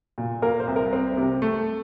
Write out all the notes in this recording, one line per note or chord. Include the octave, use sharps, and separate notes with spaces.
A#2
A#3 A#4
C5
C2
A#4
C4
C3
A3